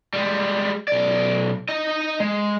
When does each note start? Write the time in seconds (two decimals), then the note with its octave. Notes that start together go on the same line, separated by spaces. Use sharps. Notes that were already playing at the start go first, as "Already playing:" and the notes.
0.13 G3 G#3
0.88 B1 D5
1.68 D#4 D#5
2.20 G#3